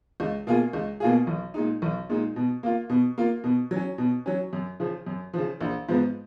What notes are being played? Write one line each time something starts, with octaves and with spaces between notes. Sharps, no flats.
C#2
B2 A#3 F4 G#4
C#2
B2 A#3 F4 G#4
B1
A#2 G#3 D#4
B1
A#2 G#3 D#4
B2
A#3 F4
B2
A#3 F4
B2
F#3
C#4
B2
F#3 C#4
F#2
C#3 F3
F#2
C#3 F3
A#1
G#2 F3 B3